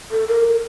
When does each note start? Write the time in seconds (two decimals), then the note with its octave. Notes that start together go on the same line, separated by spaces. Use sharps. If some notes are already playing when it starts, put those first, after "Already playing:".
0.11 A4
0.28 A#4